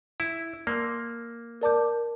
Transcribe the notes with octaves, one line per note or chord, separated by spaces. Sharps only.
E4
A#3 D5 A5 C6 E6 G6
A#4 D5 A5 D6 G6